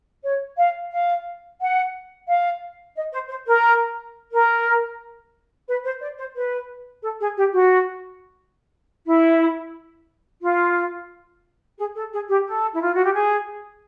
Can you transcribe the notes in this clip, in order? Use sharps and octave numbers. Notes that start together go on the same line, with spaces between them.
C#5
F5
F5
F#5
F5
D#5
C5
C5
A#4
A#4
B4
C5
D5
C5
B4
A4
G#4
G4
F#4
E4
F4
G#4
A4
G#4
G4
A4
E4
F4
F#4
G4
G#4